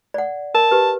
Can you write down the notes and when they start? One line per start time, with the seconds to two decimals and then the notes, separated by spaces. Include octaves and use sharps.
0.14 D5 F#5
0.54 A#4 A5
0.71 G4 B4